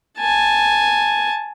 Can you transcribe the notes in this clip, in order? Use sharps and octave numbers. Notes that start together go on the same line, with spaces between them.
G#5 A5